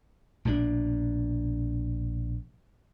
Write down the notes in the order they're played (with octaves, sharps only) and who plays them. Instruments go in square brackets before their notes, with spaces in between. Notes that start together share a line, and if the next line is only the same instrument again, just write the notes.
[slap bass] A#1 B2 D#3 D4